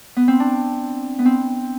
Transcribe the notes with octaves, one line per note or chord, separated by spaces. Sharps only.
B3
C4
D4
B3
C4